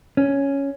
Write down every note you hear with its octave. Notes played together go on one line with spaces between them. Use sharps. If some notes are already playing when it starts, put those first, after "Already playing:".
C#4